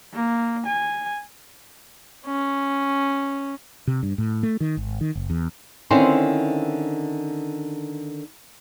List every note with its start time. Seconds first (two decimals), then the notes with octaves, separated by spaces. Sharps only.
0.13 A#3
0.66 G#5
2.26 C#4
3.87 C3
4.03 G2
4.18 A2
4.43 A3
4.60 D#3
4.77 G#1
5.01 D#3
5.15 F#1
5.30 E2
5.90 D3 D#3 C4 C#4 E4 C5